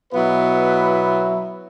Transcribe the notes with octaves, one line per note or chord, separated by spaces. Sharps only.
B2 F#3 B3 E4 B4